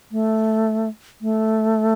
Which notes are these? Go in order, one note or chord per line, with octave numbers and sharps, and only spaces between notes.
A3
A3